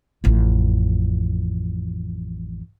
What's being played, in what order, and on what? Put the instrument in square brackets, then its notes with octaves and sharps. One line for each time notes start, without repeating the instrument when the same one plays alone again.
[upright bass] A1 F2